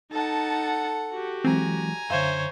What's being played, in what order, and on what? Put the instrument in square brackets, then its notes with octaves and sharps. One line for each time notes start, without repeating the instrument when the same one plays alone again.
[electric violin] D#4 A5 [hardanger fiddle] A4 F#5
[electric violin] F#4 G4
[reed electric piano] E3 F#3 G#3 [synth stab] C4 [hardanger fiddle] G#5 A#5
[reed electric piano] F#2 D3 [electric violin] C5 C#5 [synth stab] E5 F5 E7